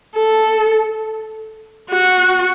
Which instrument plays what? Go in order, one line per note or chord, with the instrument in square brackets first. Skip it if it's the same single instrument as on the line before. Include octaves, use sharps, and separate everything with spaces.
[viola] A4
F#4